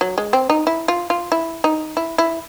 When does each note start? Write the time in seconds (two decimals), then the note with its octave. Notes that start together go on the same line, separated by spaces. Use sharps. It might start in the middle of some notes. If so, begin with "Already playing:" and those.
0.01 F#3
0.18 G#3
0.33 C4
0.50 D#4
0.67 E4
0.88 F4
1.10 F4
1.32 E4
1.64 D#4
1.97 E4
2.18 E4